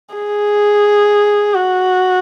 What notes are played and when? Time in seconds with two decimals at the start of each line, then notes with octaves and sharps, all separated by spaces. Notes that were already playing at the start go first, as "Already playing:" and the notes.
0.15 G#4
1.54 F#4